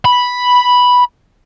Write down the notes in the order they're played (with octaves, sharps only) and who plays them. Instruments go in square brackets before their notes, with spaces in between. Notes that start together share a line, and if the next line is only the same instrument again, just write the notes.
[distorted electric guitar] B5